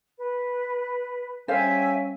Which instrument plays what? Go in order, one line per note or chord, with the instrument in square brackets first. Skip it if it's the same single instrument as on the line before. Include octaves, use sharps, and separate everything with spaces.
[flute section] B4
[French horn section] G3 C#4 [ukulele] C5 F5 [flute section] E5 G5 G#5